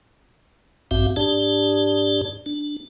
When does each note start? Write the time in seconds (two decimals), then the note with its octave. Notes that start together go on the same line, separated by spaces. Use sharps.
0.91 A1 G2 C4 F#4 E5 F5
1.16 G#2 D4 G4 D5 A5
2.46 D4